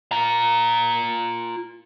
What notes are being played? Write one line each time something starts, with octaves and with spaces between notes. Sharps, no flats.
F4 A#5